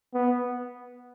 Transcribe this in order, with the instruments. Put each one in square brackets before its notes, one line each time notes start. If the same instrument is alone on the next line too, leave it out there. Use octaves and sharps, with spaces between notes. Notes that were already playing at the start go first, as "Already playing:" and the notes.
[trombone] B3